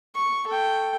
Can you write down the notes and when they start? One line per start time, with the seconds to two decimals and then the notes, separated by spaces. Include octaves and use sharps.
0.15 C#6
0.47 A4 G5